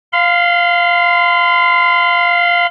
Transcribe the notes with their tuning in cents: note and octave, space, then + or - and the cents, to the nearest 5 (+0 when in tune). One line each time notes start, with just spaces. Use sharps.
F5 +0 C6 -40